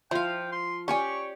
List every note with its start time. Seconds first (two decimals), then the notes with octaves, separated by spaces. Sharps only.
0.11 F3 E4 C5 F5 G5
0.52 C6
0.88 C#4 G4 C#5 D5 G#5 C#6